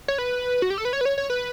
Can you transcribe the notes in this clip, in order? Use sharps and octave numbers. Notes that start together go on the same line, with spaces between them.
C#5
B4
F#4
G4
A4
B4
C#5
B4
C#5
C#5
B4